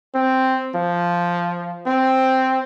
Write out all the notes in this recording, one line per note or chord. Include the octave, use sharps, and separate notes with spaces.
C4
F3
C4